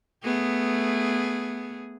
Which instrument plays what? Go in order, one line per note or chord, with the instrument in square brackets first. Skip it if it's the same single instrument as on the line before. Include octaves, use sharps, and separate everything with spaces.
[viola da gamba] A3 B3 G#4